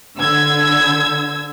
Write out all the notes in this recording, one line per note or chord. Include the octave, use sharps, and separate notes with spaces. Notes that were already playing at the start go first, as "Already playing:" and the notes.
D3 E6 G#6